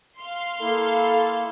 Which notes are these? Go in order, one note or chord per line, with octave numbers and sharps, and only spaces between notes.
F5 C6
A#3 E4 A4